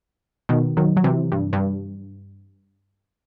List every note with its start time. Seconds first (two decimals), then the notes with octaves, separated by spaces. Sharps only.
0.49 B2 D#3
0.77 D#3 F#3
0.97 F#3
1.04 C3 E3
1.32 G2
1.53 G2